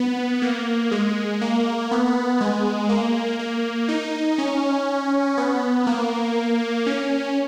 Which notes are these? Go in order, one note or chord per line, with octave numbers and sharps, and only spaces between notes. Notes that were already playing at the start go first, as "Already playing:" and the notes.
Already playing: B3
A#3
G#3
A#3
B3
G#3
A#3
A#3
D#4
C#4
B3
A#3
C#4